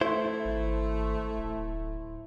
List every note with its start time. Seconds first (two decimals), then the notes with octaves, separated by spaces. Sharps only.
0.01 A3 E4 C5
0.45 G#1
1.38 D1